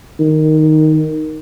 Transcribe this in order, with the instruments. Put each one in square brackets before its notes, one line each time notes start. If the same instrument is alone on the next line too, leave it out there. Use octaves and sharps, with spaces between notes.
[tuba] D#3